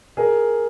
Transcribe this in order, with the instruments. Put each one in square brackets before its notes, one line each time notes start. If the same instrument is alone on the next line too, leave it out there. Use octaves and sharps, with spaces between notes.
[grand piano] G#4 A#4